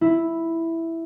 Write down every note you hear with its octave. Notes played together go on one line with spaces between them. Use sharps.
E4